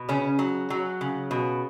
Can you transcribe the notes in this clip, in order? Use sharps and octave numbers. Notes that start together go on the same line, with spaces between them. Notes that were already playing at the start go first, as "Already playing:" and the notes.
Already playing: B2
C#3 C#4
F#3
F#3
C#3
B2